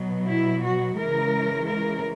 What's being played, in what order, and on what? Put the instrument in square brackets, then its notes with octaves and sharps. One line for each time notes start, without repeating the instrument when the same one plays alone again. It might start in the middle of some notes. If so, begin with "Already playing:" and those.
Already playing: [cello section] B2 F#3
E4
F#4
C#3 E3 G#3 A#4
A#4